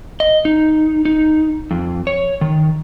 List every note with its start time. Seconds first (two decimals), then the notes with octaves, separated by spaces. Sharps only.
0.20 D#5
0.45 D#4
1.05 D#4
1.71 F2
2.07 C#5
2.41 D#3